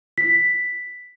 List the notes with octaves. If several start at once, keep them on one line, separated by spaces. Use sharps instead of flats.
B6